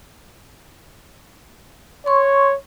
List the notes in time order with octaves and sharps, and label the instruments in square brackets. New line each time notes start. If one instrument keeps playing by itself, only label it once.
[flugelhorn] C#5 [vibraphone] C6 C#6